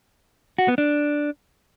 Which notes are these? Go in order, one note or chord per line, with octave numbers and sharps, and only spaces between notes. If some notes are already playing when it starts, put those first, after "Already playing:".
F#4
B3
D4